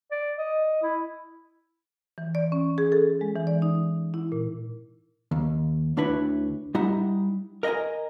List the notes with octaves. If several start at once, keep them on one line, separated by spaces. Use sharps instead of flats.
D5
D#5
E4
E3
D5
C#4
G#4
A4
G#3
E3
D5
D#4
E4
A#2
D#2
D2 D4 E4 B4 C#5
G3 D#4 E4 F#5
A#4 D#5 F#5 G#5 A#5